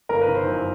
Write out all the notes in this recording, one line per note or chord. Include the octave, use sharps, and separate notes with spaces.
G1 A#4
B4
D#3
C5
F#2